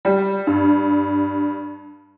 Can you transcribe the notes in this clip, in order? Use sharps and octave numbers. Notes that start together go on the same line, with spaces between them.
G3
G2